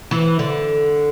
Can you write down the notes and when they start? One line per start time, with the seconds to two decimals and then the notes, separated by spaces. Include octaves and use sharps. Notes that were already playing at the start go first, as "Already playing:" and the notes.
0.11 E3
0.39 D3